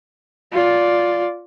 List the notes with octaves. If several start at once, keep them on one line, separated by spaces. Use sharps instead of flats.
F4 D5